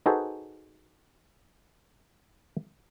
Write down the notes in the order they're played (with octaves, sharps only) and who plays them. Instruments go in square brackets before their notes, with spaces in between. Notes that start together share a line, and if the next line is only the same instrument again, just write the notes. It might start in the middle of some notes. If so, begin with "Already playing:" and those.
[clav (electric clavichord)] D#4 F#4 G#4 A4 B4 C5